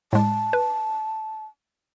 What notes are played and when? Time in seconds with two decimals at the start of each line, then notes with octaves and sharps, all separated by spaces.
0.13 A2 G#3 A5
0.53 B4